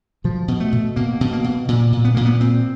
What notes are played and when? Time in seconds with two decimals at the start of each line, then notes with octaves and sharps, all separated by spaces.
0.24 B2 F3
0.48 B2
0.60 A3
0.73 B2
0.96 B2 A#3
1.21 B2
1.33 A#3
1.44 B2
1.68 A#2
1.93 A#2
2.05 B3
2.14 A#2 A#3
2.25 B3
2.40 A#2 C4